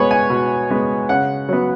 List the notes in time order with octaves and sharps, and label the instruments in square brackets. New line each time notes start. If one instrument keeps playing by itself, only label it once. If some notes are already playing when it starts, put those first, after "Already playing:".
Already playing: [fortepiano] B2 G#3 B3 B4 C#5
G#5
B2
G#3 B3
C#3 F#5
F#3 B3